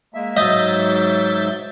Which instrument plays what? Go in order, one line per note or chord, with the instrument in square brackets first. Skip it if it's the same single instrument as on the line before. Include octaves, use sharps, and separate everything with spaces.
[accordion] G#3 A#3 E5
[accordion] G#2 F#3 [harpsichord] D#5 [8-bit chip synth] E5 G6 A6